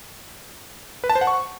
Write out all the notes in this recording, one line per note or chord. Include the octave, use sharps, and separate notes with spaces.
B4
A5
C5
F#5
C#6